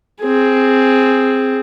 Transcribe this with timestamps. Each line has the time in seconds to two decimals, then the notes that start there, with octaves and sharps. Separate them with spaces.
0.21 C4 G#4